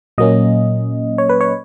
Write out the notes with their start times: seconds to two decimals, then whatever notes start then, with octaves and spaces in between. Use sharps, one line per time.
0.18 A#2 F#3 A#3 C#4 D#5
1.18 C#5
1.29 B4
1.41 C#5